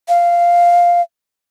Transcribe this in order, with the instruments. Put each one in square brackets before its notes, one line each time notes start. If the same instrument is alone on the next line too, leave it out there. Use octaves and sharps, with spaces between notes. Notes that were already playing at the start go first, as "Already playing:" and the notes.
[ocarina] F5